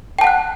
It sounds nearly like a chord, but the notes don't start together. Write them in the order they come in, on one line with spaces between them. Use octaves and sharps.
G5 A5 F#5 F#6